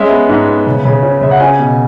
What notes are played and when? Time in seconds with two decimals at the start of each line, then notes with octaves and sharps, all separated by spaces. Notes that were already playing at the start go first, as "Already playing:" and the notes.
Already playing: G#3 C#4 E5
0.10 B3
0.29 G#2
0.48 B3
0.67 C#3
0.85 C#3
1.03 C#4
1.21 C#3 E5
1.31 F#5
1.40 C#4 G#5
1.59 B2